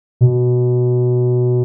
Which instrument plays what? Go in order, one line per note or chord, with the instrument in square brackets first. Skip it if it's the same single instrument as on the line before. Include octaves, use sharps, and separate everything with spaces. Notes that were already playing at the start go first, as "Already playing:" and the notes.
[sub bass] B2